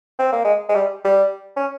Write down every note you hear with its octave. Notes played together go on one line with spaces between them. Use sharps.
C4
A#3
G#3
G#3
G3
G3
C#4